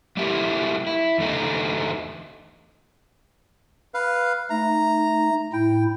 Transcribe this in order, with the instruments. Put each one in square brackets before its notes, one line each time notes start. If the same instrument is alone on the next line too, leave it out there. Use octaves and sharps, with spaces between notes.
[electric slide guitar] G3 A3 A#3 E4 G4 G#4
E4
E2 D3 A3 D#4
[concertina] B4 F5
[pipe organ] A3 D#4 [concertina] A#5
[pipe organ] A2 E4 [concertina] G5